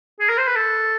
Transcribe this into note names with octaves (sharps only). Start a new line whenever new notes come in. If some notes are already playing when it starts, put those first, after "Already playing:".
G#4
A#4
C5
B4
A4